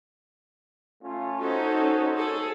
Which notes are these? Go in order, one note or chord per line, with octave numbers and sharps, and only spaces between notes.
A3 C#4 F4
C#4 D#4 F#4 A4 C5
G#4 A4